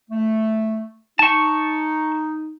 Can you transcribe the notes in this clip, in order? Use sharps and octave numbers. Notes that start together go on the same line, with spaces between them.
A3
D#4 A5 C#6